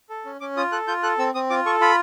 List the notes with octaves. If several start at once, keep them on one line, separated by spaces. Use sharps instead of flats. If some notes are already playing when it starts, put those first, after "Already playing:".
A4
C#4
C#4 D6
F4 D#6
A4 F#6
F4 G6
A4 F#6
C4 E6
C4 D#6
F4 D6
A4 C#6
F4 B5